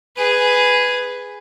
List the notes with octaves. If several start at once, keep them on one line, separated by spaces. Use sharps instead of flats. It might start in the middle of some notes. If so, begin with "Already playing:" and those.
G#4 B4